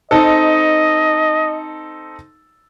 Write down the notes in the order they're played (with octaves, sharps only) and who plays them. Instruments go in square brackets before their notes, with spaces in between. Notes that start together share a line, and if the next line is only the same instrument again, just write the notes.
[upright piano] C4 D#4 A4 [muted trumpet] D#5